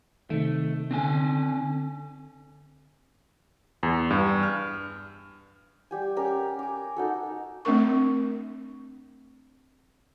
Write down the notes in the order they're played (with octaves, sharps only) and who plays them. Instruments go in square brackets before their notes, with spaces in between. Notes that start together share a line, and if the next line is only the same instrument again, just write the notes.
[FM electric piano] C3 D#3 [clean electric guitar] A3
[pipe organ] D3 [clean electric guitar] C4 D4 G#5
[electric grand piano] E2
G2
F6
[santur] G3 G4 G#5
C#4 G4 A#4 G#5
G#5 D6
D#4 F#4 A4
[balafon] A3 C4 D4 A#4 C#6